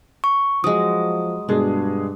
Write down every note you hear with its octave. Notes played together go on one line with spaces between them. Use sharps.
C#6
F3 F#3 G#3 D#6
G2 B2 G#3 D4 G#4